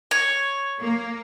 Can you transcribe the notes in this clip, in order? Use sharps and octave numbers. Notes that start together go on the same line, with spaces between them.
C#5
A#3